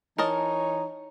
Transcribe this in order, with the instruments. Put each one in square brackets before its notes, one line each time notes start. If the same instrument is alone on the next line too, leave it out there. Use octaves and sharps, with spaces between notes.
[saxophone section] E3 C#5 [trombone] D#4 [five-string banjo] A#4 D#5 A5